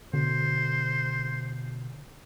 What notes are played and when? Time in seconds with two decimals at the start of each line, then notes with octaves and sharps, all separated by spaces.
0.14 B2 D3 C5